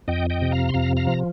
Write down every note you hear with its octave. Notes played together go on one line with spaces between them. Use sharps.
F2 D#5 G5
D#5 G5
C3
F5 A#5
C6
F2 F5 A#5
F5 A#5
F3